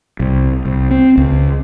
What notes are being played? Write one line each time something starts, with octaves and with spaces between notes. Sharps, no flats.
C2
C2
C4
C#2